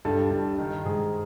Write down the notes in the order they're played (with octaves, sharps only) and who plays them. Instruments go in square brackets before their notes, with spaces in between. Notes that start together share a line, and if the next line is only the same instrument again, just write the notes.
[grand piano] G2 A4
G2
D#3
G#2 G#4